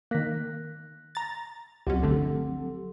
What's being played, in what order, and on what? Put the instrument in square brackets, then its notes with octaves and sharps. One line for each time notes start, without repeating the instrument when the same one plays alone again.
[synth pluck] D#3 A#3 [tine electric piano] F#6 A#6 B6
[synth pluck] A#5 A6
[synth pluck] C#2 B2 C#4 [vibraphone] F#3 C4 [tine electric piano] G4
[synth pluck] G1 D3 A3 [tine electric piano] G4 A4